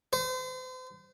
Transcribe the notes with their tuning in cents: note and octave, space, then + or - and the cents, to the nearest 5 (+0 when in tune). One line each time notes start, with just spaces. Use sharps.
C5 -40